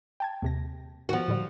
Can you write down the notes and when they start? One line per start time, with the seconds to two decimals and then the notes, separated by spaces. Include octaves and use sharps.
0.20 G5 A5 G#6
0.42 D#2 C3 A#6
1.09 D#3 F3 B3 F#4
1.28 A2 D3 G3